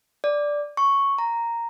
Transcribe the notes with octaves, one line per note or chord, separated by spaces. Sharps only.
D5
C#6
A#5